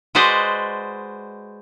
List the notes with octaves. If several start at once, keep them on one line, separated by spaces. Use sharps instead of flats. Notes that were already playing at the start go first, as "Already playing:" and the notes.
G#3 F#4 B4 C5 D5 D#5